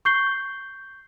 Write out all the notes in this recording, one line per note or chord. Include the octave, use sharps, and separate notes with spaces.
C#6 G6 C7 G7